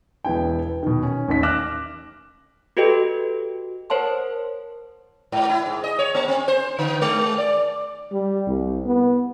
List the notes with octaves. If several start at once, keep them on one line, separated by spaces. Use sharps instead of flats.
E1 B3 E4 G5
B4
B2 D#3
C#4
A1 D#2 D#4 B6
D6 F6 F#6 A#6 E7
F#4 G4 A4 B4 D#5 G5
A#4 C5 C#5 F#5 A5 C6
G#2
E4
G#2
D#5
C#5
A#3
C4
C5
D3
G#3
D5
G3
C2
B3